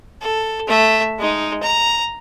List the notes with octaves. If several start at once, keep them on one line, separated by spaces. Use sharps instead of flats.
A4
A3 E5
G#3 D#4
A#5